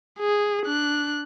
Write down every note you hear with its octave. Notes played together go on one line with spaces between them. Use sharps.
G#4
D4 F#6